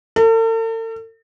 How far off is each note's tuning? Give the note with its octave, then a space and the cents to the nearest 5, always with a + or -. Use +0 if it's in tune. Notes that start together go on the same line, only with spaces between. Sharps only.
A4 +45